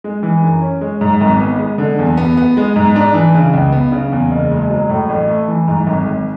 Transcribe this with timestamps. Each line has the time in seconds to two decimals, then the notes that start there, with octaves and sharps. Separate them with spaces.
0.04 G#3
0.23 E3
0.42 F#2
0.62 C#4
0.81 G#3
1.01 G#2
1.21 G#1
1.40 B3
1.59 G#3
1.78 D3
1.98 E2
2.17 B3
2.37 B3
2.57 G#3
2.76 G#2
2.96 D4
3.14 E3
3.35 C#3
3.53 C#2
3.72 B3
3.92 C#3
4.12 E2
4.31 F#1
4.51 G#3
4.70 F#3
4.89 A2
5.09 A1
5.28 A3
5.48 E3
5.68 G#2
5.87 G#1
6.06 G#1